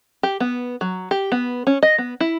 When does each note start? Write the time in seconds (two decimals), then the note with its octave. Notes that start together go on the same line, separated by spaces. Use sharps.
0.23 G4
0.40 B3
0.81 F#3
1.11 G4
1.32 B3
1.67 C#4
1.82 D#5
1.98 B3
2.20 E4